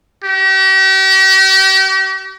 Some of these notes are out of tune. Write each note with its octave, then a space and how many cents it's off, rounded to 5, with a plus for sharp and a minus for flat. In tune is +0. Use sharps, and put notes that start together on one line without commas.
G4 -40